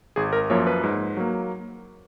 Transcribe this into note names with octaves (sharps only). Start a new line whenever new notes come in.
G#1 G#4
A#4
F#2 F3 A#3 C#5
B4
G#2
F#3 A#3